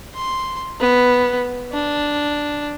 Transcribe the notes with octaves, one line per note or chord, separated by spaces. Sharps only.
C6
B3
D4